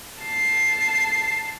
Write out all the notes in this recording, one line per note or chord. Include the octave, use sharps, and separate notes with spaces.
A5 C7